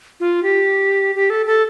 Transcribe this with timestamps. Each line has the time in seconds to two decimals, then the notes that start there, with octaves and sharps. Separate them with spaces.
0.20 F4
0.43 G4
1.15 G4
1.30 A4
1.46 A4